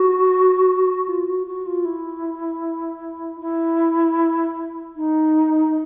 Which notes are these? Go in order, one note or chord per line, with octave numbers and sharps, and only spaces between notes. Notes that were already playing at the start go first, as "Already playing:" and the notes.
Already playing: F#4
F4
F#4
F#4
F4
E4
E4
D#4